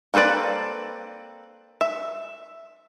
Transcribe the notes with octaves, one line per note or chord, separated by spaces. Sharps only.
A#3 C4 A4 B4 D5
E5